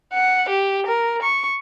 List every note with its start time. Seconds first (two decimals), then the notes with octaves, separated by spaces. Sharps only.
0.13 F#5
0.48 G4
0.86 A#4
1.22 C#6